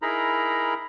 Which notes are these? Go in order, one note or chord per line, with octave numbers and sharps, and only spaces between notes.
D#4 E4 G#4 A#4 A#5 B5